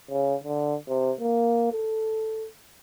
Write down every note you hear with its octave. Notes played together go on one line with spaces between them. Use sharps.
C#3
D3
C3
A#3
A4